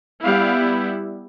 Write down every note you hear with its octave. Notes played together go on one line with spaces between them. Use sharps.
G3 B3 E4 F5